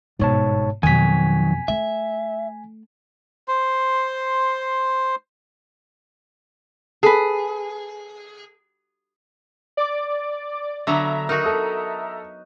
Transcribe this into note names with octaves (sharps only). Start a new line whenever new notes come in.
G1 G#2 B2 C#5 A5
F2 B2 D#3 F#3 G#5 B6
A3 E5
C5 C6
G#4 A4 B4
D5 D6
D3 F#3 B3 E5 A#5
D#4 F#4 A#4
A4 A#4 D#6